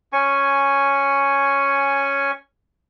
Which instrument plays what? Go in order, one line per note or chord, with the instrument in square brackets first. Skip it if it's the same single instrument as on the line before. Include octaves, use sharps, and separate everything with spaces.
[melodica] C#4 G#5 C#6